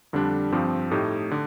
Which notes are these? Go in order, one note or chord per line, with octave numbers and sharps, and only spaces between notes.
F2 D3 G3 D4
G2 F3 C4 G4
A2 A3 D#4 G4
D3